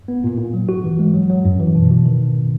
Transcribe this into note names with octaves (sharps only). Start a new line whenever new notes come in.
B3
A#2
A#2
F#3
F#4
E3
G#3
F#3
F#3
F#2
E3
B2
B2
D#3